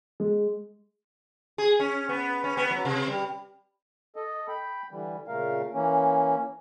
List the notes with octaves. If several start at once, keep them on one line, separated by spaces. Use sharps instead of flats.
G#3
G#4
C#4
B3
C#4
B3
F#3
C3
G3
A4 D#5
G5 B5
D3 E3 G3
A#2 C#3 A3 A#4 F5
E3 A#3 C#4